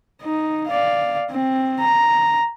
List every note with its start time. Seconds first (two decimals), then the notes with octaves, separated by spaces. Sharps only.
0.22 D#4
0.68 D5 F5
1.31 C4
1.80 A#5